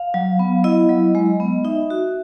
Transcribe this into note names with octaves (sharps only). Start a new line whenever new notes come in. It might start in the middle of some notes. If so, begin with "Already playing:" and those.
Already playing: F5
F#3
B3
E4 D#5
F#3
G#3
B3
D#4 E5
F#4